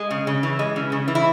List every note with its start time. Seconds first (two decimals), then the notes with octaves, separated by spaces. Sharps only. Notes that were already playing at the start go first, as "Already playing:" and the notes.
Already playing: G#3
0.10 C#3
0.27 C#3
0.43 E3
0.59 G#3
0.76 C#3
0.92 C#3
1.08 E3
1.15 E4